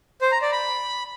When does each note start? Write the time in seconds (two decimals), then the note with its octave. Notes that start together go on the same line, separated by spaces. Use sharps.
0.21 C5
0.32 A#5
0.42 D5
0.52 B5